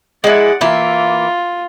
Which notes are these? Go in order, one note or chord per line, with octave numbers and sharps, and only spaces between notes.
G#3 E4 D5 F#5
E3 A#3 F4 E5